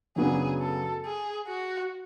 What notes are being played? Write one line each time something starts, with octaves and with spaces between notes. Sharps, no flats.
F#2 C#3 F#3 B3 D4 G#4
A4
G#4
F#4